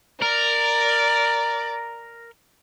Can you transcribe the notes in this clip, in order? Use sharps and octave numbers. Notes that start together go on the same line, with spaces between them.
A#4 D5